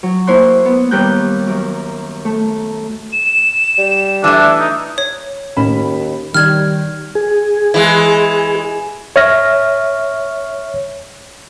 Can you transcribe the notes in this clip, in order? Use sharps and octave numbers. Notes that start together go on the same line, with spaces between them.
F#3
A#3 E4 C5 C#5 C6 F#6
B3
D#2 G3 B3 A#4 F#6 G6
F#2
A3
E7
G3
E3 A3 D4
D#4
C#5
D#2 A2 C#4 B5 E7
D#3 G3 F6 G#6
G#4
E3 G#3
C#5 E5 F6 A#6